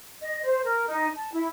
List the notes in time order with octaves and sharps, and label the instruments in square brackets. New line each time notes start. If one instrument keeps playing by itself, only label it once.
[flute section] D#5
C5
A#4
D#4
A5
E4